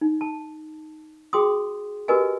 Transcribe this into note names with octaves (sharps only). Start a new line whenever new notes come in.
D#4
A5
F#4 G#4 G5 C6 D#6
F#4 G4 A#4 B4 D#5 G#5